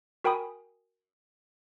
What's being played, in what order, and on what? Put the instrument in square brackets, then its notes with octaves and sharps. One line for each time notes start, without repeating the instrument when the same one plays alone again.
[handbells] F#4 A#4 G5 G#5 B5 D#6